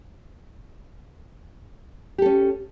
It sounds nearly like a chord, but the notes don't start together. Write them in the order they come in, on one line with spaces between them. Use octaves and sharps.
G4 A4 C#4